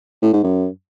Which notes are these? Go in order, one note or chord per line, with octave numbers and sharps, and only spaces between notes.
A2
G#2
F#2